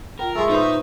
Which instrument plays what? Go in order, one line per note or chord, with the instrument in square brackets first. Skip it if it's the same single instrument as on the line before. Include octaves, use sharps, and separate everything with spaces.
[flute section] F4 G5 [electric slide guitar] A#4
[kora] G#3 F4 A4 [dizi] E5 [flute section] C#6
[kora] A#2 B3 C5 [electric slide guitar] D#4